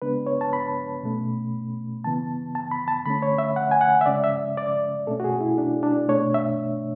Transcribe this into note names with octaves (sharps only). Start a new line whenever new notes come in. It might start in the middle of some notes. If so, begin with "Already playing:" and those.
C#3 G#3 B3 D4 B4
C#5
A5
B5
B2 A3 C#4
C#3 E3 B3 A5
A5
B5
A5
D3 A3 C#4 B5
C#5
E5
F#5
G#5
F#5
E5
C#3 G#3 C#4 D5
E5
D5
B2 A3 C#4 A4
F#4
G#4
E4
D4
D4
B2 A3 D4 C#5
E5